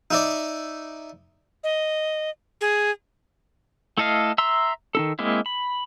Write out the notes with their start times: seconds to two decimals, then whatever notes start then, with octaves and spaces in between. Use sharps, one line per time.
0.11 D#4 E4 D5
1.64 D#5
2.61 G#4
3.98 A3 E4 A4 D#5 F5
4.38 E5 A#5 C6 E6
4.95 D#3 D#4 A4
5.19 G#3 A#3 C4 E4
5.46 B5